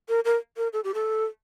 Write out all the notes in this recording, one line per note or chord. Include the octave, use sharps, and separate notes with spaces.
A#4
A#4
A#4
A4
G4
A4